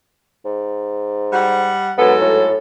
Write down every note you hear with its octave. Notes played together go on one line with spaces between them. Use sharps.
G#2
G3 F#5
G#2 F#3 B3 A4
A2